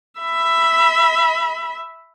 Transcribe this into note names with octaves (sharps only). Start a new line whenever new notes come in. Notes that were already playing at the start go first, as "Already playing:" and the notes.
E5 B5